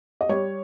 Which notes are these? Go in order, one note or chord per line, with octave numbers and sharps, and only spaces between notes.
D#5
G3 C#5